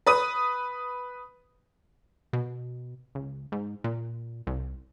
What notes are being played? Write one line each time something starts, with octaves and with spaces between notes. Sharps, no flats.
B4 D#6 D#7
B2
C#2
G#2
A#2
C2